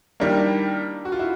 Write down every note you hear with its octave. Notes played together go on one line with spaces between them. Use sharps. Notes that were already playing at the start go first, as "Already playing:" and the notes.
D#3 G3 A#3 D4 E4
F#4
F4
E4 F#4